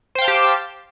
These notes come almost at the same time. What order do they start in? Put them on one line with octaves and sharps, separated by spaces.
C5 G5 F5 A5 G4